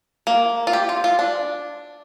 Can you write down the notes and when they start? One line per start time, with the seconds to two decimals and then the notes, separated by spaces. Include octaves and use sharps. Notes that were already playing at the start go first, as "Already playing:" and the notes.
0.27 A#3
0.67 F4
0.73 G4
0.89 F4
1.04 F4
1.19 D4